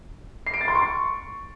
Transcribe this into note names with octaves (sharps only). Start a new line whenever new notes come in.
C7
D7
A6
C6
C#6